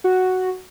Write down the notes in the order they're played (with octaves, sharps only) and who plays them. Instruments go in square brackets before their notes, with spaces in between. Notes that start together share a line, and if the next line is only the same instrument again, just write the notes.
[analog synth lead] F#4